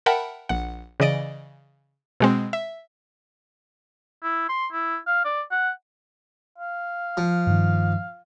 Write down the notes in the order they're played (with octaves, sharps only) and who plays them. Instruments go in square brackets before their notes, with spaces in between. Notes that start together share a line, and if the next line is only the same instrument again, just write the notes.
[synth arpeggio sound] A#4 E5 F#5 G5 A5 B5
A#1 F#5
C#3 E3 D5 D#5 D7
B2 G#3 C4
E5
[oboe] E4
C6
E4
F5
D5
F#5
[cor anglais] F5
[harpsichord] F3
[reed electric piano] G2 D#3